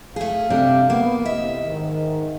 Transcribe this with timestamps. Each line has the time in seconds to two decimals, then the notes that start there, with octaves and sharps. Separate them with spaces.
0.16 A3 G#4 F5
0.50 C3 G3 D4
0.90 A#3 B3
1.25 C3 E4 D#5 E5
1.65 G#2 D#3